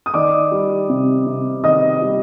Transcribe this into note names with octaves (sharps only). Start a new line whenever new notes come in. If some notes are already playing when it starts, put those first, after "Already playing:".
D#6
D#3 D5 D6
G3
C3
C3
D#3 D#5 D#6
G3